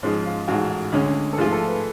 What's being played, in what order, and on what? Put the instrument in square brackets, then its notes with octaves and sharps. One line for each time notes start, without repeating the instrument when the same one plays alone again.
[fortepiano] G#2 F3 G#3 [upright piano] C#4
[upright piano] F4
[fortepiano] A1 G#2 G#3 [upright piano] F#4
[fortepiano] D2 D3 G#3 C#4
[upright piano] A4
[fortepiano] G#2 F3 A3 F4 [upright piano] G#4
[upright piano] A4
B4